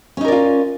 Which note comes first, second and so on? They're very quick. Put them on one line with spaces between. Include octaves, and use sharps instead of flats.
C#4 D#4 A#4 D5 F4